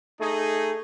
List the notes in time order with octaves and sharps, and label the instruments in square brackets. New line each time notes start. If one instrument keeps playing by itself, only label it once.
[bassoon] A3 [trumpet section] D#4 G#4